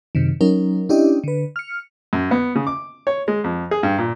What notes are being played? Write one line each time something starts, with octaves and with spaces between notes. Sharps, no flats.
F#2 C3 D#3
F#3 C#4 D#4 A#4
C#4 D4 E4 G4 D5 D#5
D3 B4
F6 C#7
F#2
B3
C#3
D6
C#5
G#3
F2
G#4
G2
A#2